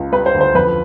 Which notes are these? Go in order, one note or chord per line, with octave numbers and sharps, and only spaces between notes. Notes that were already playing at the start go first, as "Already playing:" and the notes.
Already playing: C#2
G3 B4
C5
D2
C5
F2 B4